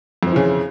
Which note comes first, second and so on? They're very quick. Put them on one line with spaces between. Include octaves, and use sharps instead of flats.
F2 F3 E3 C#3